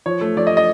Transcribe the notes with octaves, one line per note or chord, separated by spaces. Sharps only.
F3 C#5
A3
F3 D5
D#5
D#5